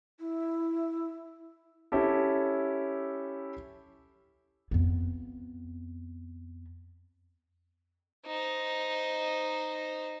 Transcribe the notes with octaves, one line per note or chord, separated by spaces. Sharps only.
E4
C#4 E4 G4 A4
F2 B3
D#4 C5